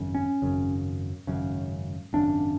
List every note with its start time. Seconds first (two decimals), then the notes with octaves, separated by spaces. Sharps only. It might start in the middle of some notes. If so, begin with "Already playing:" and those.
Already playing: G#1 F#2 C#3
0.15 C#4
0.42 G#1 F#2 C#3
1.27 G#1 F#2 C#3
2.13 G#1 F#2 C#3 D4